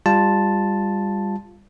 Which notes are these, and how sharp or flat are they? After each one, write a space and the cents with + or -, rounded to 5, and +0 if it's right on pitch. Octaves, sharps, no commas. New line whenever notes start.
G3 +25 F4 +0 A5 +0